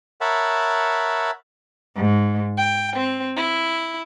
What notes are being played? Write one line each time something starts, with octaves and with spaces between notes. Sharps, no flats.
A#4 C#5 E5 F#5 A5 B5
G#2
G5
C4
E4